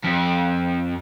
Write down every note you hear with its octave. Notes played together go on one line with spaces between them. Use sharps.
F2